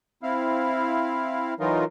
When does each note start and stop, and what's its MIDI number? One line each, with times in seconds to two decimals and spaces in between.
0.23 1.54 60
0.23 1.54 64
0.23 1.54 77
1.60 1.85 52
1.60 1.85 54
1.60 1.85 63
1.60 1.85 65
1.60 1.85 70